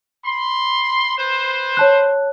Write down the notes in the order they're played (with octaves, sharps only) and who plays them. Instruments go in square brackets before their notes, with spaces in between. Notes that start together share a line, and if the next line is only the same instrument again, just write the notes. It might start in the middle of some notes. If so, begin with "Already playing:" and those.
[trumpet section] B5 C6
B4 C5
[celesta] C#5 A5 F#6